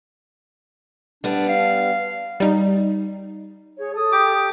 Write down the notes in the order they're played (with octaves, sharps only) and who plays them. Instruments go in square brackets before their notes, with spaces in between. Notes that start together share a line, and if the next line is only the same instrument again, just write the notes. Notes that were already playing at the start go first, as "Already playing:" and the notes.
[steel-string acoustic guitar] G3 B3 [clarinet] D4
[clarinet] F5
[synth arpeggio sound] G3 D#4
[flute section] G#4 C#5
A4 D#6
[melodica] G4 D6